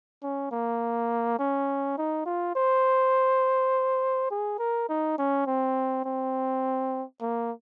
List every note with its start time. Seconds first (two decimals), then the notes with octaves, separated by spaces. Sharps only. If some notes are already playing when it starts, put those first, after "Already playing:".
0.23 C#4
0.51 A#3
1.39 C#4
1.98 D#4
2.26 F4
2.55 C5
4.31 G#4
4.59 A#4
4.89 D#4
5.18 C#4
5.47 C4
6.05 C4
7.21 A#3